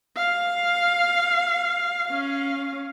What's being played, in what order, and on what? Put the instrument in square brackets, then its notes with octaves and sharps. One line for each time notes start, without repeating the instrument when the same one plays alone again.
[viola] F5
C#4 F5